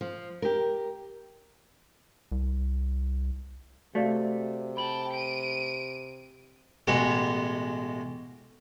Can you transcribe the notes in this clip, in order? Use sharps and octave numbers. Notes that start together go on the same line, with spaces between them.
F3
G4 A#4
C2
C3 A3 F#4 D5 F5
G5 A5 B5 F#7
D7 D#7
A1 B2 G#3 G4 F#5